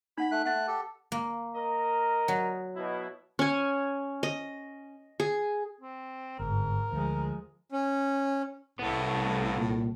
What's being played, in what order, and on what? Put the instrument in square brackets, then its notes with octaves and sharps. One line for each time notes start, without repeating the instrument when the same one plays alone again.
[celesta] D#4 F#5 B6 [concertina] B5
[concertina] A3 F#6
[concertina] A3 F#6 [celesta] F#5 A6
[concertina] G4 A4
[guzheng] A#3
[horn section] A#4 D#5
[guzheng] F#3
[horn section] B2 E4
[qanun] C#4 G#5
D#5
G#4
[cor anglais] C4
[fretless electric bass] G1 [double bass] G#2 [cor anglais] A#4
[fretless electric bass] D2 [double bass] F3 G#3
[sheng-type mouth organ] C#4
[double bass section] C2 [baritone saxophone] A2 [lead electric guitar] A3 B3
[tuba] A#2